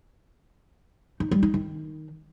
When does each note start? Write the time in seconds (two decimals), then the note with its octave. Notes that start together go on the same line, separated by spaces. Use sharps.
1.20 D#4
1.31 G3
1.43 D#4
1.54 D#3